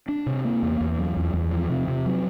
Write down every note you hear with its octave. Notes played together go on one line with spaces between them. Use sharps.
D4
C3
A#3
E2
E2
F#3
E2
E2
F3
C3
C3
F#3